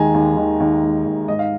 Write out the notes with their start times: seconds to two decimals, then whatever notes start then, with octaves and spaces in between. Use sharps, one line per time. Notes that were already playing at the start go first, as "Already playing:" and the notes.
Already playing: D#2 D#3 G#3 G#5 A#5
0.14 D#2
0.37 D#3
0.60 D#2
0.83 G#3
1.06 D#2
1.28 G#2 D#5
1.39 F5